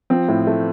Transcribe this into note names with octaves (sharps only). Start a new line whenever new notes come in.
F3 C4
A2
A3